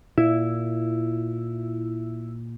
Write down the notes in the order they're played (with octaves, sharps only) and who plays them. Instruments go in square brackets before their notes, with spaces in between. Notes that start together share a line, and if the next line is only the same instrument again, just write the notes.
[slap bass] A#2 [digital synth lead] E4